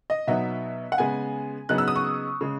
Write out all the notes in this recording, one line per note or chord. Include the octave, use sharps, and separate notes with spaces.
D#5
B2 F#3 B3 D#4 E5
F#5
C#3 G#3 B3 G#5
C#3 F#3 B3 D#4 F#6
E6
D#6
C#6
C#3 G#3